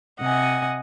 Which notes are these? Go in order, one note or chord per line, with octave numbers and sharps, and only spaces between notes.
C3 D#5 F#5 G#5